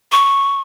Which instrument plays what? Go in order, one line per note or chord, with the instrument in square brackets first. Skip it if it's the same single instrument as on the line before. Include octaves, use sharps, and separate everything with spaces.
[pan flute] C#6